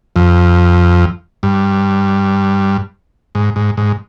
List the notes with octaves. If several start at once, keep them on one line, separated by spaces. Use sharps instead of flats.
F2
G2
G#2
G#2
G#2